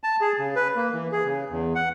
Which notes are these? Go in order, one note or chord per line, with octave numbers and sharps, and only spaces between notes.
A5
G#4
C#3
B4
A#3
E3
G#4
C#3
E2
F#5